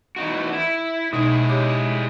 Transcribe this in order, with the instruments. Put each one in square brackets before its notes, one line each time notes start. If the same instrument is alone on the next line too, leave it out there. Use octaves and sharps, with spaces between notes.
[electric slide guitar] E3 D#4 F#4
E4
[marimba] B2 D#4 [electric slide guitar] G#3 E4 G#4
[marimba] G4 C#5 D6